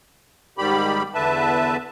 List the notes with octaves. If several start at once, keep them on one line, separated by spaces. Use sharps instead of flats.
G#2 D#3 G3 G4 B5
E2 D3 B4 E5 A5